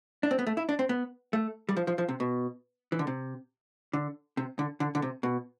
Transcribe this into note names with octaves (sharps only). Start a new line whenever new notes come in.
D4
C4
B3
A3
E4
D4
C4
B3
A3
G3
F3
F3
F3
C3
B2
E3
D3
C3
D3
C3
D3
D3
D3
C3
B2